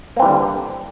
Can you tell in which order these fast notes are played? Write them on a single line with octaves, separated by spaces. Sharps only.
A#3 C4 E3 G3 D3